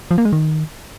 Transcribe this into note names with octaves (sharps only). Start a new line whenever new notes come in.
F3
A#3
G#3
D#3